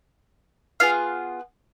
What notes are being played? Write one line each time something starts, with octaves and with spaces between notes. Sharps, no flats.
B3 F4 G#4 F5